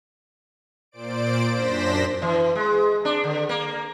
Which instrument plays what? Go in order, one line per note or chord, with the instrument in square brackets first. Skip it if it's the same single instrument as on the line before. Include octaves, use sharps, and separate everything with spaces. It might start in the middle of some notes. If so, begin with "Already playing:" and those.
[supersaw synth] A#2 C5 D5 D7
F#2 D4 C5 A#6 B6 E7
[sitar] E3
G#3
D4
D3
A#3